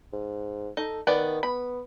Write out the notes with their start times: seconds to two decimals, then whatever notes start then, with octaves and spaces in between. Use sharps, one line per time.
0.12 G#2
0.77 D#4 A4
1.07 D#3 B3 B4 D5
1.43 B3 B5